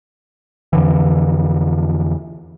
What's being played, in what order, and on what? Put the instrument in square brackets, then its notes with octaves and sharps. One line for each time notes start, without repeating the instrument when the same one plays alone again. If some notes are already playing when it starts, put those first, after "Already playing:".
[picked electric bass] F2 D3 E3